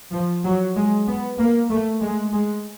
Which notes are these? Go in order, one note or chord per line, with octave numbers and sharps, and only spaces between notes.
F3
F#3
G#3
B3
A#3
A3
G#3
G#3